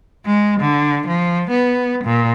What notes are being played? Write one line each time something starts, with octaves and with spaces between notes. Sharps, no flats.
G#3
D3
F3
B3
A#2